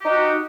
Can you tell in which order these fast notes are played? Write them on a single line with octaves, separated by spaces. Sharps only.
G4 D#4 F#4